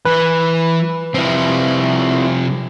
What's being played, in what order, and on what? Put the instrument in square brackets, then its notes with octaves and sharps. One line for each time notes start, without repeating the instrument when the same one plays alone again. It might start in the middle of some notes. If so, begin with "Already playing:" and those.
[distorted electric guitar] E3 [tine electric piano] B4
[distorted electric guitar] C3 F3 [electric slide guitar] C4 E4